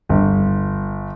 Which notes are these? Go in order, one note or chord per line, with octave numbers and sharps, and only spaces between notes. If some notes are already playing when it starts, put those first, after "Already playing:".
G1